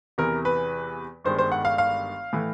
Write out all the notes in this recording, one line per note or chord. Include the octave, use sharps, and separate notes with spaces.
E2 C3 E3 A#4
B4
G1 G2 D#3 G#3 C5
C5
F#5
F5
F5
A2 E3 A3